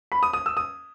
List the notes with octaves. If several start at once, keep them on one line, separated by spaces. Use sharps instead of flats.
B5
D#6
D#6
E6
D#6